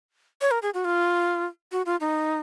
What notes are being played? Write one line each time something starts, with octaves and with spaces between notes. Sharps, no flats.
C#5
A#4
G#4
F#4
F4
F#4
F4
D#4